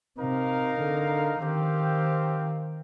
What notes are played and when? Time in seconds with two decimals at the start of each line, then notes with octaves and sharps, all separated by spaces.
0.19 C3 D#4 A#4 F5
0.80 D3
1.40 D#3 C4 G4 C5 F5